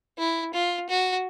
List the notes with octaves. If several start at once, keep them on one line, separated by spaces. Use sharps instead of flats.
E4
F4
F#4